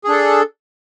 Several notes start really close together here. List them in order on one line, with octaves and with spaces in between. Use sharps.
G#4 D4 A4